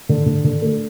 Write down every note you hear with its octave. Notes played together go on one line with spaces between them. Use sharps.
D3
D3
D3
A3